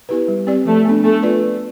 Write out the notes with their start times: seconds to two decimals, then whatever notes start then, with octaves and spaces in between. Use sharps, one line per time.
0.09 B3 E4 G4 B4
0.28 G3
0.47 C4 G4 D5
0.65 F3 A3
0.85 B3 D4
1.03 A3 B3
1.23 F4 B4 D5